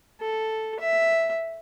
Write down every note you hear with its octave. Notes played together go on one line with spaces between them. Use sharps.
A4
E5